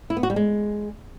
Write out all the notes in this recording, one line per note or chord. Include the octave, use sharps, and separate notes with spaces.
E4
B3
F#4
G3
G#3